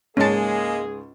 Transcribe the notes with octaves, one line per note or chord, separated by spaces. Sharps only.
C#2 G#2 G#3 A#3 C#4 G#4 A5